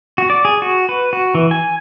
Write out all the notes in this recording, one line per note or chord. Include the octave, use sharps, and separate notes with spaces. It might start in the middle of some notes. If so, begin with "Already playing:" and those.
F#4
D5
G#4
F#4
B4
F#4
E3
G#5